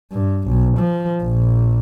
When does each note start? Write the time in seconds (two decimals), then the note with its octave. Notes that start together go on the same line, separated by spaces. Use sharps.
0.12 G2
0.48 B1
0.78 F3
1.23 A#1